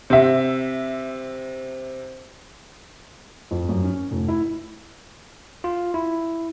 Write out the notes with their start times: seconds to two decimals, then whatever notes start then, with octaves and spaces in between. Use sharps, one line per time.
0.10 C3 E5
3.51 F2
3.69 F#2
3.84 C#4
4.11 F1
4.28 E4
5.64 F4
5.94 E4